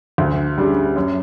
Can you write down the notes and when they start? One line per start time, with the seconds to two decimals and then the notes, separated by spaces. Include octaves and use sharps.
0.18 D2
0.58 C#3 G3 D4
0.96 F#2